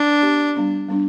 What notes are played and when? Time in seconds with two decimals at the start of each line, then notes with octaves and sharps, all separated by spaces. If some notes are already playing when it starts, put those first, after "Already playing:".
Already playing: D4
0.22 B3 G4 D5
0.55 G3 B3 D4
0.88 G3 B3 D4